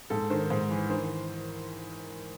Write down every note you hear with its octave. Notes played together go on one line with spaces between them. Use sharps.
G#2 A4
D#3 C5
G#2 C5
E3
D#3 C5